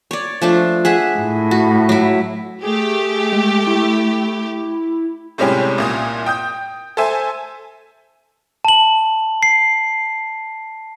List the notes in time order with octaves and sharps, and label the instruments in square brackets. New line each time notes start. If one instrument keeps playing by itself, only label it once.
[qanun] C#5 D5
F3 A3 D4
G#4 E5 F#5
[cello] A2
[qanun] F#4
F#3 E4
[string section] A3 G4 [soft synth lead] G#4
[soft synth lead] G#3
E4
[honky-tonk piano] A2 C3 G3 G#3 C#4 G4
C2 A#2 D#6
G5 D#6 G6
A4 C5 E5 G#5
[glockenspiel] A5 F#7
C7